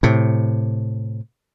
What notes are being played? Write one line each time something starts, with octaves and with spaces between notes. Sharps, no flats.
A2 C3